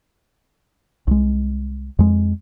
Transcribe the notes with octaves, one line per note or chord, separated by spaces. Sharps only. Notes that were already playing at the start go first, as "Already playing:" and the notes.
C2 G#3
F2 G#3